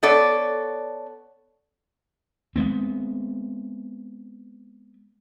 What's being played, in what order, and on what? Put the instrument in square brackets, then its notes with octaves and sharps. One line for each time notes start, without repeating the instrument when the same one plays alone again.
[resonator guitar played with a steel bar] B3 A4 C#5 D5
[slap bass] G#3 A3 B3 C4